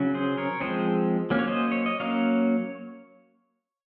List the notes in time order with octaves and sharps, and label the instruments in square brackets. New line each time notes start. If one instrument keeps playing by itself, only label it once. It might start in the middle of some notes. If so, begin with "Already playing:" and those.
Already playing: [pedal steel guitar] C#3 F#3 C#4
G#4 C5
A#4 C#5
F3 G#3 C4 G#4 C5
F#3 A#3 C#4
C#5
C5 D#5
C#5
D#5
F#3 A#3 C#4 C#5 F5